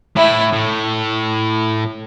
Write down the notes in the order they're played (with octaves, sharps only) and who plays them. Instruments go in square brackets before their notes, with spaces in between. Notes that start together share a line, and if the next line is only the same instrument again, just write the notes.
[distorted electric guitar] A2 [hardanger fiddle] E4
[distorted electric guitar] A2